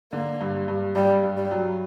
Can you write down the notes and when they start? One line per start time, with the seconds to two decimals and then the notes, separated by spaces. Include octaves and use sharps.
0.13 D3 A#3
0.41 G2
0.68 G2
0.95 G2 G3
1.23 G2
1.37 G3
1.51 F#3